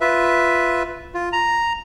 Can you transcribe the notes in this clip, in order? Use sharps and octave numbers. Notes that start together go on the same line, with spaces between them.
F4 B4 E5
F4
A#5